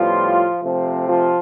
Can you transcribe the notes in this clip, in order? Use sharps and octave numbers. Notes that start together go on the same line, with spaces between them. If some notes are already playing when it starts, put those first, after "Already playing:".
Already playing: A2 F3 G3 B3 F4
C3 F3 A3 C4
F3 F4